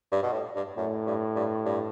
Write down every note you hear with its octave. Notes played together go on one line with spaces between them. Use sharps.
G2
B2
A2
G2
F#2 A2
G2
G2
G2